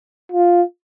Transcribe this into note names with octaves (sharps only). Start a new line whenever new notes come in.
F4